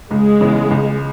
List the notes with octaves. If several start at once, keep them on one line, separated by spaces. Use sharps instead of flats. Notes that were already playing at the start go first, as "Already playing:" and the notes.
C#2 G#3
C#3 E3 B3
C#2